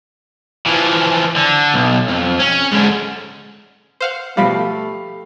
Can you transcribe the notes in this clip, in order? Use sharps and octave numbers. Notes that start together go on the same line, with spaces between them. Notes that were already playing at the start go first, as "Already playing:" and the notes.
E3 F3
D3
B1
F2
C#4
G#2 D3
C5 F5 F#5
B2 F3 G3 A3 G4 F5 B5